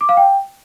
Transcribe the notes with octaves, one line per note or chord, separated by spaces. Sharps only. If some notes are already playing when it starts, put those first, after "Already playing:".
D6
F5
G5